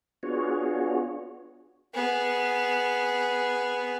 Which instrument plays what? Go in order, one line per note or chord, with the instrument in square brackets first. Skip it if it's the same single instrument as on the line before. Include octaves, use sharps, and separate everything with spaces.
[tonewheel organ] B3 D4 F4 F#4 G#4 C#5
[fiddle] B3 G#4